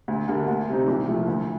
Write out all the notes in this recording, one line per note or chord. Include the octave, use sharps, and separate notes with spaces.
D2
D3 G3 A#3 D4
D2
C3 G3 C4 D#4
C2
A#2 F3 A3
D2